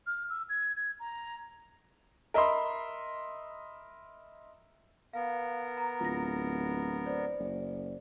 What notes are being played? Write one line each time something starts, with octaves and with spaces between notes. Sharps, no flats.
F6
E6
G#6
G#6
A#5
A#4 D#5 E5 B5 C6
B3 A#4 F5
A#5
D1 F4 A#6
C5 D5
F#1